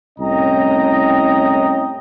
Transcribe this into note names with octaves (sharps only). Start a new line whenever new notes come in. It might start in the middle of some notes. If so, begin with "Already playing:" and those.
C2 A2 C#4 D#5 G5 A#5